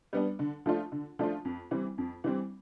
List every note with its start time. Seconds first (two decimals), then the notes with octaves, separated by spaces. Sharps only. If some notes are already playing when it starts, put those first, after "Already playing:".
0.13 G3 B3 D4
0.39 D3
0.66 F3 A3 D4 F4
0.92 D3
1.19 F3 A3 D4 F4
1.45 F2
1.71 E3 G3 C4
1.98 F2
2.24 E3 G3 C4